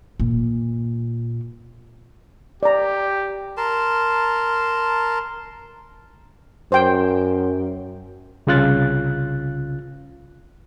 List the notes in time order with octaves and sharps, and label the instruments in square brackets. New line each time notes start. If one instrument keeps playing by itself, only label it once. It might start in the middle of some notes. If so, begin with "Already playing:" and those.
[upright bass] A#2
[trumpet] G4 [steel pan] D5 A#5
[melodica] A#4 A5 C6
[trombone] F#2 [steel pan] C5 G5
[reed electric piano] C2 C#3 F4 F#6 A6